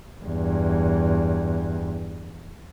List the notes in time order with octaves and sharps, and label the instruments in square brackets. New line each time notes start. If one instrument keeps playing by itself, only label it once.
[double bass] E2 G2